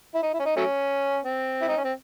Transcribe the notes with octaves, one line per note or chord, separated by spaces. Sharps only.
E4
D#4
E4
C#4
D#4
F#3 A3 C#4
C4
E4
D#4
C#4
C4